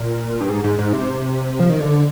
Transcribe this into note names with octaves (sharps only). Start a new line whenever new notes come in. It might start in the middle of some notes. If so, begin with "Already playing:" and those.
Already playing: A#2
G2
G#2
G#2
G#2
C3
F3
D#3
D3